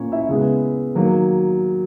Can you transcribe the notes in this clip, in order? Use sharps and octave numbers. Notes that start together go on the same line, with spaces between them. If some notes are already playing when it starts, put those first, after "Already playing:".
Already playing: A#2 A#3 C#4 C#5
E4 E5
C#3 G#3 B3
D#3 F#3 A#3